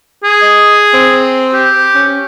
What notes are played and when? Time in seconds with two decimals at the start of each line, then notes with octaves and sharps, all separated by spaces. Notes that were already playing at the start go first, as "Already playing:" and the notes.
0.24 G#4
0.42 D#5
0.94 C4
1.54 G4
1.95 C#4